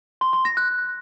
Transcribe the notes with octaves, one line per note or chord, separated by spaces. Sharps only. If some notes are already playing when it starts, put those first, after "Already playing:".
C6
C6
A#6
F#6